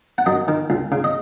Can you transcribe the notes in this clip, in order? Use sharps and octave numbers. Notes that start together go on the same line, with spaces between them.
F#5
F#2 D#5
D#3
C#2
C#3
D#5